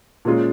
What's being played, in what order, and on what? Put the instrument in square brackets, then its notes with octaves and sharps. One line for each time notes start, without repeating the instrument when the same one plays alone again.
[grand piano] A#2 G#3 C#4 F4